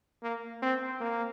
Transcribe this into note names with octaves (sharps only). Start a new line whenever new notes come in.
A#3
C4
A#3